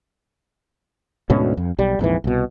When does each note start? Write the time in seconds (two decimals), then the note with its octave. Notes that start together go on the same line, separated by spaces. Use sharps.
1.30 D2 G#2 B2 C#4
1.57 F2
1.79 B1 G3
1.99 A#1 F2 G#2 E3
2.24 C2 B2